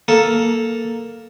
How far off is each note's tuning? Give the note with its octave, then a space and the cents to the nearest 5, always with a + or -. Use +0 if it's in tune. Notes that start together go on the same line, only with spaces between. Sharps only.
A#3 +0 A4 +0